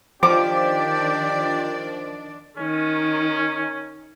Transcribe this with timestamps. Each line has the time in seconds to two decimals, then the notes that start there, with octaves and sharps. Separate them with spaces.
0.23 D#3 F3 D4 G4 D5 D6
2.58 D#3 C#4